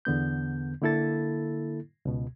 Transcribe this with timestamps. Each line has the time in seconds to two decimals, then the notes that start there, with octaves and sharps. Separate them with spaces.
0.05 E2 D3 B3 G6
0.82 D3 A#3 E4 A4 A6
2.05 C#2 B2